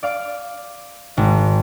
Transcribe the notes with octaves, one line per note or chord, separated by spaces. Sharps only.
D5 F5 D6
G#1 G#3